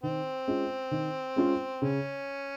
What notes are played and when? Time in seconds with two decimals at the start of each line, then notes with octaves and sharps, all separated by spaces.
0.03 D#3 C4
0.48 G#3 C#4 F4
0.91 D#3
1.36 G#3 C#4 F4
1.80 C#3 C#4